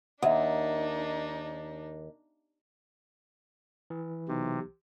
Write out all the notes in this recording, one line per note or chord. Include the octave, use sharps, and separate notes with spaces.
D#2 D4 D#4 E5 F#5
E3
B1 C3